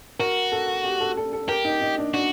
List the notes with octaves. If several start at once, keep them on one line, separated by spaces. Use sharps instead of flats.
F#4 A#4
A4
G4
A4
A4
A4
G4 A#4
D#4
D#4
D4
D4 F#4